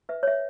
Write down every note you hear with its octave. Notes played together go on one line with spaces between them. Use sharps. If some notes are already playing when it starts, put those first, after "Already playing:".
B4 E5
C#5
E5